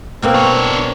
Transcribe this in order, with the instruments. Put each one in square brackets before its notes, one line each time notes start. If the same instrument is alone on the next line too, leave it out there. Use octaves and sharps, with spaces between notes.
[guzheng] B2 A#3 C4
[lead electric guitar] D4 C#5